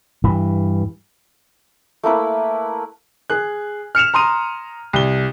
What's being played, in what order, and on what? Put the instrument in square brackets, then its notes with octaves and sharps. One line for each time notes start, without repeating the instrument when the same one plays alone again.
[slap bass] G2 E3
[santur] A3 A#3 E4 B4
[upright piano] G#4 F#6
F6 C#7 E7 F7
A#5 C6 D#6 D#7
C2 G7